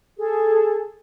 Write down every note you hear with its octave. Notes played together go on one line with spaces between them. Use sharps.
G#4 A4